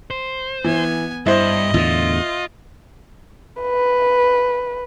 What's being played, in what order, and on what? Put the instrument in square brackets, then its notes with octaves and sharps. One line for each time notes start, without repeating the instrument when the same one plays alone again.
[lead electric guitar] C5
[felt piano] E3 [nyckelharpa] B3 G#5
[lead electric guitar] G2 [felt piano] E4 C5 [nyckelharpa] D#5
[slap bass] E2 A2 D3 [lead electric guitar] F4
[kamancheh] B4